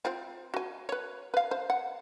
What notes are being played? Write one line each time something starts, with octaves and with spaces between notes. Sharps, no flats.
C4 F4 C5
F#4 G#5
B4 C#5
B4 F5
C5
F#5